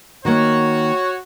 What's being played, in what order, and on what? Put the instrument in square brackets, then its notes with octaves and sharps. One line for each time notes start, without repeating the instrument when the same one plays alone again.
[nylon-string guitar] D#3 A#3 [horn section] F#4 C#5